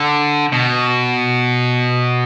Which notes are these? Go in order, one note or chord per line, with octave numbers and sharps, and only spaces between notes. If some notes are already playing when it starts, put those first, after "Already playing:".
Already playing: D3
B2